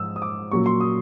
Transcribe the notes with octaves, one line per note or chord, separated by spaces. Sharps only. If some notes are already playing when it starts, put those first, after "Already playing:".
Already playing: G#2 F3 G#3 D#6 E6
D#6
D6
A#2 F#3 A#3 C#4 C#6
C6
D#6